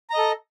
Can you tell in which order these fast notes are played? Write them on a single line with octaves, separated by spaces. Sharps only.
A#5 D#5 A4